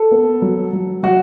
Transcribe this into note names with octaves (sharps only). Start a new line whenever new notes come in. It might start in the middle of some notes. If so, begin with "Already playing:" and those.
Already playing: A4
B3
F#3
F#3
F#3 F#4